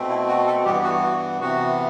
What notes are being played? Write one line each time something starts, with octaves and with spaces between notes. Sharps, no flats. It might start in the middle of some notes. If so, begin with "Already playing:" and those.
Already playing: B2 A3 C4
E4
F#4
A3 A4
G2 E3 G3 B3 G4
F#4
F#4
C3 E3 B3 F#4